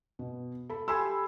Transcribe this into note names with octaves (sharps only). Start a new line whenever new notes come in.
B2
A4 B5
G4 A4 G#5 B5 C6 E6